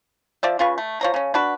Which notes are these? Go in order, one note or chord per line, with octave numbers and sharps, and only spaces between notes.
F3 D5 E5
C#3 F4 B4 C#6
A3
F3 C#5 A#5
C#3 C#4
D4 F#4 B4